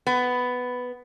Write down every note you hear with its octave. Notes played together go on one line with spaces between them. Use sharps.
B3